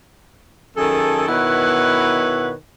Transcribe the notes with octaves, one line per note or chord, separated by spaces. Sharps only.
F#2 D#3 G#4 A4
B2 D#3 E4 B4 C#5 F#5